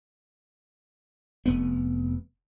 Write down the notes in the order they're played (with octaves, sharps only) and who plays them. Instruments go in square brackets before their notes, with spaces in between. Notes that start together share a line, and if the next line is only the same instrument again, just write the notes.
[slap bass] F1 B3